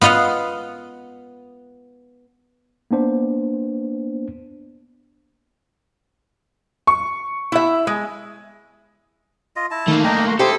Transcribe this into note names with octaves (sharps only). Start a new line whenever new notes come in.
B3 F4 D#5 F5 F#5
A#3 B3 D4 C5
C#6
E4 E5
G#3
F4 D#5
E4 A5
D#3 A3 A#3
D4 D#4 D#5 G5
F#4 C6
E4 G4 A4 C5 D#6